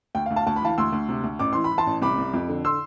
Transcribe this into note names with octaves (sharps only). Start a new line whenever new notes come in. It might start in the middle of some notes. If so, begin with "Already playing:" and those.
D2 G5
F5
D2
F5 A5
D2 A5
B5
E3 F5 A5
D2 C6 E6
D2
C3
D2
A1 D6
E3 C6
B5
E3
A5 C6
A1
C2 B5 D6
C2
F2
D3
C6 E6